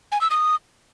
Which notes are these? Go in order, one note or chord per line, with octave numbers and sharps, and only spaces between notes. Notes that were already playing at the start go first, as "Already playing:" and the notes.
G#5
E6
D#6